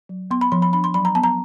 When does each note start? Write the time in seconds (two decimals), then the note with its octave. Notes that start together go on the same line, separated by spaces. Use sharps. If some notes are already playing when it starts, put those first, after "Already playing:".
0.09 F#3
0.31 B3 C6
0.41 B5
0.52 F3 C6
0.62 B5
0.73 D4 B5
0.84 C6
0.94 F#3 B5
1.05 A#5
1.15 B3 A5
1.23 A#5